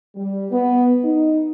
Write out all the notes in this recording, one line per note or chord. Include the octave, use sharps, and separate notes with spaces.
G3
B3
D#4